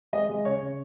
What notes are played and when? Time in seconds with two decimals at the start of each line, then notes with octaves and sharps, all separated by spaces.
0.13 G#3 D#5
0.29 G#3
0.45 C#3 C#5
0.61 C#3